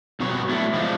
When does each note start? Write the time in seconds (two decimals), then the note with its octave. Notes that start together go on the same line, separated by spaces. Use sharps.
0.20 G2 B2 F#3 B3 C#5
0.49 A3 D4 E4
0.73 F3 G#3 D4